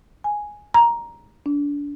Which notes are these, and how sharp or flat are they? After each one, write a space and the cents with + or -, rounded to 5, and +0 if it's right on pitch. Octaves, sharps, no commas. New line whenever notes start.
G#5 +0
A#5 +10
D4 -30